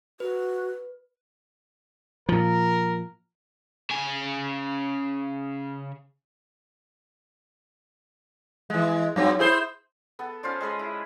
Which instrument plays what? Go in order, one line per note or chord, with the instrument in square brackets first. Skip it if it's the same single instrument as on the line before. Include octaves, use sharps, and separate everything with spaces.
[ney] F#4 [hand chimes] B4
[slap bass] A#2 F3 [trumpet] A#4
[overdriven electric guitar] C#3 G#5
[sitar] E3 G#3
G2 F#3 C4
E4 G#4 C5
[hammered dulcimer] B3 A4
C#4 F4 C5 D5
G#3 G#4 B4 D#5
E4